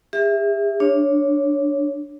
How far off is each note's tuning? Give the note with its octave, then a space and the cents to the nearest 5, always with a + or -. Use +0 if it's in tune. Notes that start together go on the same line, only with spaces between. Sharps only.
G4 +45 E5 +0
D4 +0 C#5 +0